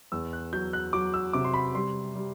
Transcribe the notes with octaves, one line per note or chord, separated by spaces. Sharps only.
E2 E6
F#6
F#3 G6
F#6
F#3 D6
E6
C3 D6
C6
B5
G3 C6
G3